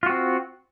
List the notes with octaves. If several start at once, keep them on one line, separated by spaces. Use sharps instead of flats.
C4 F4 F#4